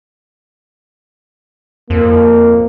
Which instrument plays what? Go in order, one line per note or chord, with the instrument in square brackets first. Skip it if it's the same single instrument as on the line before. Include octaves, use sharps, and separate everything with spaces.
[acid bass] F2 [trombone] A#3